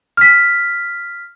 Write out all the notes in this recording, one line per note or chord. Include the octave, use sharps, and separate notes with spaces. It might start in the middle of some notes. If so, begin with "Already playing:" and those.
F6 B6